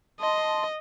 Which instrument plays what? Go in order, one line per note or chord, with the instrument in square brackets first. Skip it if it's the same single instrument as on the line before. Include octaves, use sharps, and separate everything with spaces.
[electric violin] D#5 [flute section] A5 C6